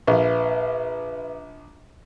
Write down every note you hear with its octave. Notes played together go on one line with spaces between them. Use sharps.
A#1 B4 E5